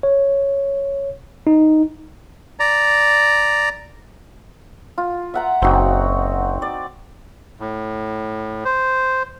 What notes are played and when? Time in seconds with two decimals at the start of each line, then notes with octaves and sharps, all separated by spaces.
0.03 C#5
1.47 D#4
2.60 D5 A#5
4.98 F4
5.34 E5 F#5 A#5
5.62 F#1 C4 D#4 F#4
6.62 D5
7.60 A2
8.65 C5